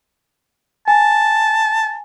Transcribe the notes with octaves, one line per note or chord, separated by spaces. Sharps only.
G#5 A5